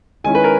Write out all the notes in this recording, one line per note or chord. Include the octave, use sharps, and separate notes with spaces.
D#3 G#3 C#4 E4 G#5
B4
A#4